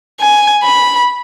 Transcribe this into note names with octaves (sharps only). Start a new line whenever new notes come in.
G#5
B5